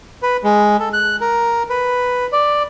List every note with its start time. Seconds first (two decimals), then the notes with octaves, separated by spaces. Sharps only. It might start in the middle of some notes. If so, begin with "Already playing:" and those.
0.22 B4
0.43 G#3
0.79 A4
0.93 F#6
1.21 A#4
1.70 B4
2.33 D5